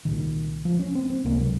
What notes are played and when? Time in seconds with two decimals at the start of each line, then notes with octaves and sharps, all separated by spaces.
0.05 C2 A#2 D#3
0.65 F3
0.79 C#4
0.95 C4
1.10 C4
1.24 C#2 C3 A#3
1.40 F#3